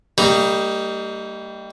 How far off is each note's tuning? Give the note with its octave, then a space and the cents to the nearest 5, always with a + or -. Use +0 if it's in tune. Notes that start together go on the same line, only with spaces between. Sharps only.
G3 +0 A#3 -45 D#4 +0